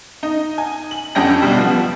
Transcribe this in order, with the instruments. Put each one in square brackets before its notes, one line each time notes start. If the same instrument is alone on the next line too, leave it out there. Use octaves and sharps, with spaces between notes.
[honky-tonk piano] D#4
G#5
F#7
F2 D3 C#4 G4 G5 A#6
B1 B2 G3
F3 B3